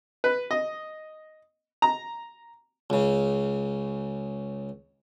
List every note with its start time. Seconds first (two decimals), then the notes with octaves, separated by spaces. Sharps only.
0.24 B4
0.51 D#5
1.82 A#5
2.90 C#2 C#3